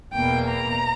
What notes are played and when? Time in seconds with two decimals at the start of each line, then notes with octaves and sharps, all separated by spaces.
0.13 E2 B2 A#3 G5
0.49 A#5